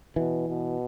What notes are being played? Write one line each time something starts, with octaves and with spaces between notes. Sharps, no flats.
B2 E3
B2